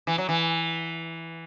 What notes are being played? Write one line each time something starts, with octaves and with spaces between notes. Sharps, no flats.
E3
F#3
E3